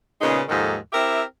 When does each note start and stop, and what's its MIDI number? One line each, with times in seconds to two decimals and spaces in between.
0.21 0.40 46
0.21 0.40 49
0.21 0.40 56
0.21 0.40 59
0.21 0.40 61
0.21 0.40 63
0.49 0.76 39
0.49 0.76 44
0.49 0.76 51
0.49 0.76 53
0.49 0.76 69
0.93 1.22 60
0.93 1.22 64
0.93 1.22 67
0.93 1.22 70
0.93 1.22 76